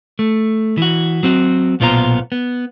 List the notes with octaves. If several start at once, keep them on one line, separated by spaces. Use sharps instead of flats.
A3
E3 F#4
F#3 C4 F#4
B1 A#2 B3 F4 C5 A#5
B3